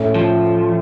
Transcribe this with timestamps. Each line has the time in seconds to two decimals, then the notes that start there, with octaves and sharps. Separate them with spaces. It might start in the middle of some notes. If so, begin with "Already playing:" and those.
Already playing: A2 A3 C#4
0.15 F3